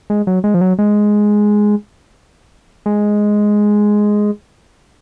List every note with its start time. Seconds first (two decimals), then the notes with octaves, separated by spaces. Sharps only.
0.10 G#3
0.27 F#3
0.44 G#3
0.54 F3
0.61 F#3
0.79 G#3
2.86 G#3